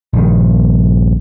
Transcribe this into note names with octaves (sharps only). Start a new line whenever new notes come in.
A#1 G2 D#3